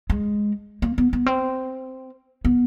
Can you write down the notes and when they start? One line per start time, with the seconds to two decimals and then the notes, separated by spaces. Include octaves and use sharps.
0.10 G#3
0.82 A#3
0.98 B3
1.13 B3
1.26 C4
2.45 B3